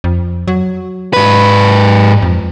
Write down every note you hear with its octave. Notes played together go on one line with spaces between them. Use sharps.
F2
F#3
G#2 B4
F2